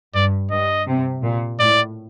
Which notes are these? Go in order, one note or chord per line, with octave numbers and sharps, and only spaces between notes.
G2 D5
G2 D#5
C3
A#2
A2 D5